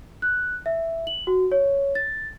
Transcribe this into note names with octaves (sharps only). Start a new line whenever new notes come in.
F#6
E5
F#7
F#4
C#5
A6